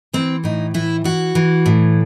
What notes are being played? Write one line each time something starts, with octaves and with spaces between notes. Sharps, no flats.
E3 C4
A2 D#4
E3 E4
E3 F#4
E3
A2